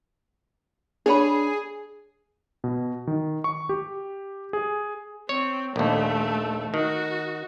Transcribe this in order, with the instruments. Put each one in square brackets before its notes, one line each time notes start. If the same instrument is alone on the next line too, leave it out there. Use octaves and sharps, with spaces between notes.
[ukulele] D4 C#5 B5 [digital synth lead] G#4
[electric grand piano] B2
D#3
C#6
G4
G#4
[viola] C4 [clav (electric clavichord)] C#5
[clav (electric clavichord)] A#1 D#2 [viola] A3 A4
[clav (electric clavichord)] D#3 [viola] F#4